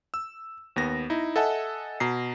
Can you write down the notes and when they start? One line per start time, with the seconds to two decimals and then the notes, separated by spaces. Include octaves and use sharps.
0.14 E6
0.76 D#2 B3 A#6
1.10 D#4 E4
1.36 A4 D#5 E5 F#5 G#5 A5
2.00 B2 A#5 C7